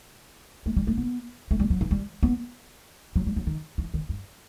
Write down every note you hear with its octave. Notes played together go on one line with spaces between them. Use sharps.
A3
G3
A3
B3
A3
G3
F#3
E3
G3
B3
F#3
G3
F#3
D#3
E3
D#3
G2